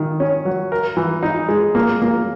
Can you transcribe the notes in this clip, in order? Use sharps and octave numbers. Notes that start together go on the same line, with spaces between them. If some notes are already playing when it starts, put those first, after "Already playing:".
Already playing: D#3
C#4
F#3
A#4
E3
D#4
G#3
A#3
A#3